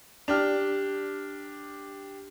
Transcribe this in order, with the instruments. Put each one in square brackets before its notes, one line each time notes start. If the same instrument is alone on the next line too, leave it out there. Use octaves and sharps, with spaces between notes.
[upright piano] D4 G4 F6